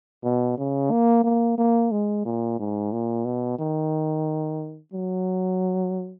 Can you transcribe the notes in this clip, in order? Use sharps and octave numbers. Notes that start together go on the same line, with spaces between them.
B2
C#3
A#3
A#3
A#3
G#3
A#2
G#2
A#2
B2
D#3
F#3